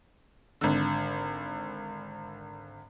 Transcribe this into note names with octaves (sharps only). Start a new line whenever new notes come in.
G#1 D3